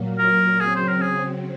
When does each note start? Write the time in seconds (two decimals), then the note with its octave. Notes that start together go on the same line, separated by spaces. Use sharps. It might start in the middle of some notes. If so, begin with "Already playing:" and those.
Already playing: A#2 F#3 A#3
0.19 A#4
0.60 C#3 F#3 C4 G#4
0.76 C5
0.88 A#4
1.01 G#4